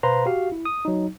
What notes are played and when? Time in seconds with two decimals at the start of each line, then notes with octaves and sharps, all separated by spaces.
0.03 B2 B4 C5 F5 A#5 C6
0.26 F#4 G4 F5
0.52 E4
0.65 D#6
0.85 F#3 D#4